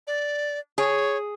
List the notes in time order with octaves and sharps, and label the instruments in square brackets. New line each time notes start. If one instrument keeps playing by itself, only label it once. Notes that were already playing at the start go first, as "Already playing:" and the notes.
[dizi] D5
[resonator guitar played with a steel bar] G#4 [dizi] C#5